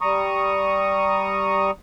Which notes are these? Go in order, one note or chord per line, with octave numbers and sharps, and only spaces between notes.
G3 A#5 C#6 D#6